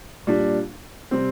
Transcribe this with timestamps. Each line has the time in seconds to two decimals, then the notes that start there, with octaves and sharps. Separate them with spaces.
0.27 A#2 G3 D4
1.11 C3 G3 C4